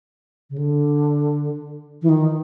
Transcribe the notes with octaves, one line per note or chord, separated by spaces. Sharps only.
C#3
D3
E3
D#3